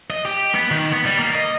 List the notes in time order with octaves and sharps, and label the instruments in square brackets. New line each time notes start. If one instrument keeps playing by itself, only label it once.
[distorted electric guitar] D#5
G4
B3
D#3
B3
G3
A#3
D#5